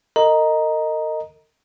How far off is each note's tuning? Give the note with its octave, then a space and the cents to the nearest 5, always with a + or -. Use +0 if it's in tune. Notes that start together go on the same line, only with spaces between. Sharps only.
A#4 -40 D#5 +0 A#5 +5